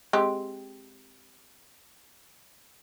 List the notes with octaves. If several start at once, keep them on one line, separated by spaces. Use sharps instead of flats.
G#3 C4 G4